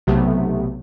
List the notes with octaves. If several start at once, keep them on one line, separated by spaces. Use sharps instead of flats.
B1 C3 A3 B3